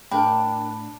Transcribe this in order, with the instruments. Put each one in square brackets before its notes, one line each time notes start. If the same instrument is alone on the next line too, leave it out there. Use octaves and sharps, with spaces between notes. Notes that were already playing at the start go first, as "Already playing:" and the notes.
[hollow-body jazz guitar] A2 [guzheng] D4 [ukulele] A#4 G5 [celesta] A5 B5